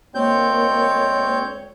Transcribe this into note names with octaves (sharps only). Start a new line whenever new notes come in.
D2 G#3 A#3 C4 C#5 G6